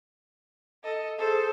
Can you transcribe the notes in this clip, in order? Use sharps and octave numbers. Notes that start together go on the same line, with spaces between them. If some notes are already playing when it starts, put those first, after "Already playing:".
A4 D#5
G#4 A4 C5